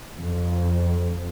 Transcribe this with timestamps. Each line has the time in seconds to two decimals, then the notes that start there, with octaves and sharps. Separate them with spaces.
0.18 F2